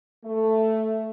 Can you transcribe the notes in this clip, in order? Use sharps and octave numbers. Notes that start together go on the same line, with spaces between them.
A3